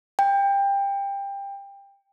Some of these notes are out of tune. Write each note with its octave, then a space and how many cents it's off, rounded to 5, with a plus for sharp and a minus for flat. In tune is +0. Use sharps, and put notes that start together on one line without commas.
G5 +20